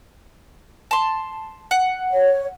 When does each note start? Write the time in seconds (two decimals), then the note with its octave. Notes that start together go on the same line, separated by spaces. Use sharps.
0.91 A5 C6
1.71 F#5
2.11 C#5